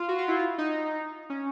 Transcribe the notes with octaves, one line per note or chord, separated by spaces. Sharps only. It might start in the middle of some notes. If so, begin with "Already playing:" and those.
Already playing: F4
F#4
F4
E4
F4
D#4
C#4